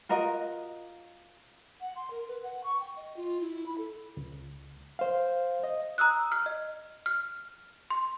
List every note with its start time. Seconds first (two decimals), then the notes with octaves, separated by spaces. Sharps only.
0.09 F4 F#4 A#4 D#5
1.81 F#5
1.96 C6
2.11 A#4
2.28 B4
2.43 F#5
2.64 C#6
2.80 G5
2.96 D#5
3.17 F4
3.41 E4
3.66 B5
3.78 A4
4.17 C#2
4.99 C5 F5
5.64 D#5
5.98 A#5 D#6 E6 F#6
6.32 F6
6.46 D#5
7.06 F6
7.90 C6